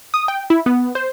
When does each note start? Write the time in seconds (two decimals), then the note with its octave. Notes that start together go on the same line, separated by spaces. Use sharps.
0.14 D#6
0.28 G5
0.50 E4
0.66 B3
0.95 C5